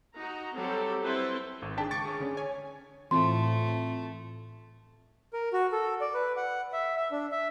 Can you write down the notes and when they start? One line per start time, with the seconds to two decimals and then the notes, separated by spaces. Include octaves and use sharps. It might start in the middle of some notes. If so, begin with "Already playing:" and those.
0.17 D#4 F#4 A#5
0.55 F#3 G3 C4 G4 A4
1.02 C4 E4 A4 B4 C5
1.62 G#1 D#3
1.77 D4 G#4 G5 A5 B6
1.91 C#2 C#6 D6 A6
2.05 G#4 C#5
2.20 D3 C#4
2.37 C#5 G#5
3.11 A2 E3 A3 C4 F4 C6
5.33 A#4
5.53 F#4
5.72 A4
6.01 D5
6.14 B4
6.36 F#5
6.73 E5
6.96 E5
7.11 D4
7.32 E5